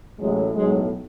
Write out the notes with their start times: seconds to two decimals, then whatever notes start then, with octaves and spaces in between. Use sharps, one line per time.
0.19 A1 A2 F#3 G#3
0.55 B1 A2 F#3 G#3